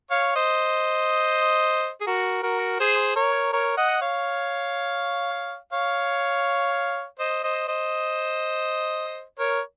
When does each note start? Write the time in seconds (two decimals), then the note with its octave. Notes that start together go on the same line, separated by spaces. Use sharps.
0.11 C#5 F5
0.36 C5 D#5
2.01 G#4
2.07 F#4 A#4
2.43 F#4 A#4
2.80 G#4 C5
3.16 A#4 C#5
3.53 A#4 C#5
3.77 D#5 F#5
4.01 C#5 F5
5.73 C#5 F5
7.19 C5 D#5
7.44 C5 D#5
7.68 C5 D#5
9.39 A#4 C#5